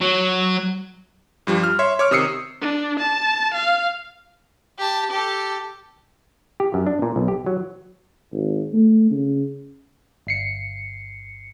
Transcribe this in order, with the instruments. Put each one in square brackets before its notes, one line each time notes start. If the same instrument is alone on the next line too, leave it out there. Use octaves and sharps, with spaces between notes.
[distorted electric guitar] F#3
[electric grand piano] G2 F3 G3
F6
C#5 E5 C6
C#5 D6 F6
C3 D#3 D#6 E6 C7 C#7
[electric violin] D4
A5
F5
[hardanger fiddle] G4 A5
G4 A4
[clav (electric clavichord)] G4
F#2
D4
A#2
B1
G4
F#3
[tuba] G#1
A3
C#3
[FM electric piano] G1 C7 C#7